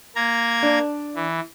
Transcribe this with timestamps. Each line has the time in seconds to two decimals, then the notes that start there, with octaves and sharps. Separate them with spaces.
0.16 A#3 A#5 G#6
0.63 D4
1.15 E3